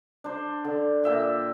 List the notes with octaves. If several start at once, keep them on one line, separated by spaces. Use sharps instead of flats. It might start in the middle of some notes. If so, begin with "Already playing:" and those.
D4 C5
D3
A#2 E5 G5